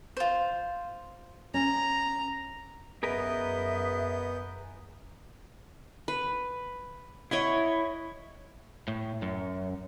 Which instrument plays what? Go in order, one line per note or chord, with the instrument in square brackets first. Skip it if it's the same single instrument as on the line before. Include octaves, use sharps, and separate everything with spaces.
[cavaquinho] F4 C5
[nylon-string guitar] C#4 [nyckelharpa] A#5
[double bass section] F#2 [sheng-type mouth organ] B3 D#5 G6 [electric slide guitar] G#4 A#4 B4 [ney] E5
[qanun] B4
[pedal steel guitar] E4 [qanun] C#5 D#5 F#5
[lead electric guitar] A2
F#2